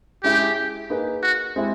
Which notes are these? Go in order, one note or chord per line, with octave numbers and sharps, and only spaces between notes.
G#3 C#4 E4 G4 G#4
A#3 D#4 G#4 B4
F#4
G#3 C4 E4 G4